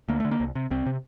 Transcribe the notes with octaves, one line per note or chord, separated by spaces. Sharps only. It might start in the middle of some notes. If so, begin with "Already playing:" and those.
D2 A#3
D3 A3
A#3
C2
C3
C2 C4
C3